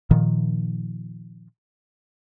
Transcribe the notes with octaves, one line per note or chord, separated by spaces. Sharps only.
A#2 D#3 F3